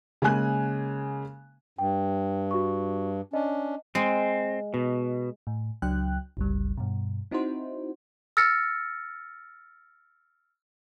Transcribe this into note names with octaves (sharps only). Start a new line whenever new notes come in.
C#3 G#3 A#3 G#5 F#6
G2 G5
F#4 C#6
C#4 D4 D#5
G#3 C4
B2
A2
C#2 F#3 D4 G5 F#6
G1 C#2 G3
G2 B2
C4 D#4 E4 F#4 C5
E6 F6 A6 A#6 C#7